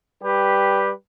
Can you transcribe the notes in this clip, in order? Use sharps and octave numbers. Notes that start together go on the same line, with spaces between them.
G3 G4 B4